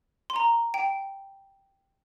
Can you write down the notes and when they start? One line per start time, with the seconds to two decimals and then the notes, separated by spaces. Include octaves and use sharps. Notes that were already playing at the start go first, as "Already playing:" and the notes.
0.30 C6
0.36 A#5
0.74 G5